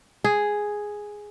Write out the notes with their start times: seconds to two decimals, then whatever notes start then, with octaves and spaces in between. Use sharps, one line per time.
0.24 G#4